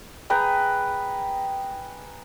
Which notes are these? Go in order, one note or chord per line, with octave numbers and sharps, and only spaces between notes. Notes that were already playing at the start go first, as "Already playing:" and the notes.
G#4 B4 G5 A#5